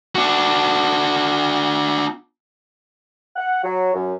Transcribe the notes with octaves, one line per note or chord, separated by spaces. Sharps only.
D4 F#4
F#5
F#3
F#2